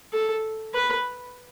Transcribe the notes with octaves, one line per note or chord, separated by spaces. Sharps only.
A4
B4